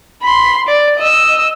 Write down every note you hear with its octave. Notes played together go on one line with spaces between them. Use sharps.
B5 C6
D5
D#5 E6